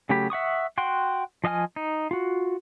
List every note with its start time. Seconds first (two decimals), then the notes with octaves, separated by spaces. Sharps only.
0.09 C#3 F#3 A3 G4 B5
0.30 E5 F#5 C#6 D#6
0.78 F#4 F#5 G5 C6
1.44 F3 D#5 F5 G#5 F6
1.76 D#4
2.11 F4 F#4